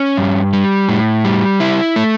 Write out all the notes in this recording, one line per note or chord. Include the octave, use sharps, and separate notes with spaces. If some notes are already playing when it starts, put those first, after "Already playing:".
Already playing: C#4
G2
G3
A2
G3
E4
A3